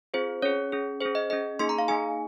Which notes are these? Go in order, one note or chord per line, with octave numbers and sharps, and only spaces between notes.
C4 F4 G#4 C5
C#4 G#4 C#5
C#4 G#4
C#4 G#4 C5
D#5
C#4 G#4 D#5
A#3 D#4 G#4 C6
A#5
F5
A#3 D#4 G#4 G#5